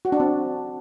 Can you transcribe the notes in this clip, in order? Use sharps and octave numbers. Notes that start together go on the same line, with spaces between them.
F#4
D4
C4